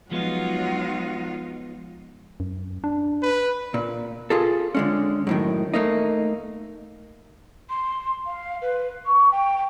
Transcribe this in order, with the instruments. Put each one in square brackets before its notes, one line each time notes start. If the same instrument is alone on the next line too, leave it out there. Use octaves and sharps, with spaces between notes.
[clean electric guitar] F3 G#3 B3 [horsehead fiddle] F#3 F#5 [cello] D#4 F4
[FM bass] F#2
D4
[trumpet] B4
[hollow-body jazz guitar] A#2
F4 G#4 A4
D3 G#3 C#4
F#2 A2 D#3
A3 A#3 D#4
[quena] C6
F5
B4
C#6
G5